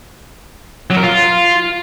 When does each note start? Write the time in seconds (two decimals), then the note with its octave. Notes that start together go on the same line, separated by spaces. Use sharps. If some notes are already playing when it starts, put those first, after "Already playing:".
0.90 F#3
0.97 A#4
1.03 F4